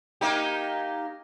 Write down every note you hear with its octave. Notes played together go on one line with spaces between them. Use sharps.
A#3 D#4 G4